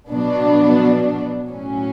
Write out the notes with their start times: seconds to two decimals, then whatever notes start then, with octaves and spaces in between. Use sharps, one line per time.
0.10 B2 F#3 B3 D4
1.48 A2 F#3 C#4